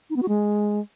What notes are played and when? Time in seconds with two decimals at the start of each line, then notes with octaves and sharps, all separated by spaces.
0.10 D#4
0.16 B3
0.22 F#4
0.29 G#3